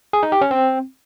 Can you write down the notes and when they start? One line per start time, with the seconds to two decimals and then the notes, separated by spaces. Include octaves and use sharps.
0.13 G#4
0.23 D#4
0.32 G4
0.41 C#4
0.51 C4